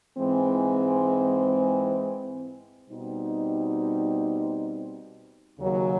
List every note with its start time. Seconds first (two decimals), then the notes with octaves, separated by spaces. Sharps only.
0.17 G#2 E3 G#3 C4
2.88 B2 G3 C4 D#4
5.59 D#2 C#3 F#3